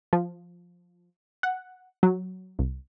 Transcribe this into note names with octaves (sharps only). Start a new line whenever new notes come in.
F3
F#5
F#3
C2